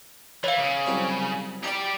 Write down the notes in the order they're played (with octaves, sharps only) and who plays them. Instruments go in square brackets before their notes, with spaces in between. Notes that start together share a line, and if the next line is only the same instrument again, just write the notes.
[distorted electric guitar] E3 [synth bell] C#5 F5
[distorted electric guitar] C#3
[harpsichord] C2 F#3 C4
[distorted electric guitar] G4 D5 [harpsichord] A#5 B5